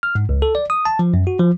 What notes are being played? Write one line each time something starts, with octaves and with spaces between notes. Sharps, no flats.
F6
G#2
C#2
A4
D5
D#6
A5
F3
F#2
F#4
F3